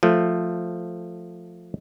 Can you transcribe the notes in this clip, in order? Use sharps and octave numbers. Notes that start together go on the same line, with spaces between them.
F3 A3